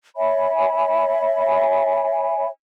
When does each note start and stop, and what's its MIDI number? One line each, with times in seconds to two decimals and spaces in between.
0.16 2.48 73
0.16 2.48 76
0.16 2.48 80
0.16 2.48 83